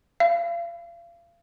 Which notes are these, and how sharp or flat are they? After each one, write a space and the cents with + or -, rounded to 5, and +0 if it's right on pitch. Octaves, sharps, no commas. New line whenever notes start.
F5 -35